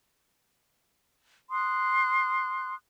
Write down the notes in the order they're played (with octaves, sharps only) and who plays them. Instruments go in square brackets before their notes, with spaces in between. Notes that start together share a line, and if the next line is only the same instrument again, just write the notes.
[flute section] C6 D#6 F#6